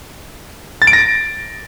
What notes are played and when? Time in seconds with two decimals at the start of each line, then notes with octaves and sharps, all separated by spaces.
0.82 A6
0.87 D7
0.93 A#6